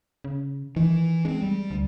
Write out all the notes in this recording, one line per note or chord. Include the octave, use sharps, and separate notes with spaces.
C#3
D#3 E3
G#3 C4 D4
G3
D2